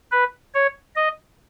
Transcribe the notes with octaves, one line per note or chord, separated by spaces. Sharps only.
B4
C#5
D#5